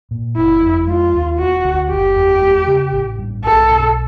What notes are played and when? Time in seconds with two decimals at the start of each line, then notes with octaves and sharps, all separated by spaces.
0.11 A#2
0.36 F#1 E4
0.61 F2
0.87 G#3 F4
1.14 D#2
1.38 E1 F#4
1.64 D2
1.90 F#1 G4
2.15 E2
2.41 G#3
2.67 C#3
2.92 A1
3.19 G2
3.43 B1 A4
3.70 B2